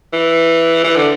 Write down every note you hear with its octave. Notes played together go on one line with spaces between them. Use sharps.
E3
E3
D3